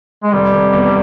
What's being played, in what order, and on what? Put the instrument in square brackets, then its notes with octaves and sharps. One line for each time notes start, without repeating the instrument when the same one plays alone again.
[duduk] G#3
[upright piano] F1 [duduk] G3
[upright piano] F1
E2